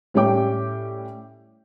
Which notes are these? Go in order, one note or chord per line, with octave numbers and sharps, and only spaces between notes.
A2 G3 C#4 C#5 G5 D6